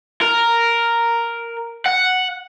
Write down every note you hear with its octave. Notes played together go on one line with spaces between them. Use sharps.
A#4
F#5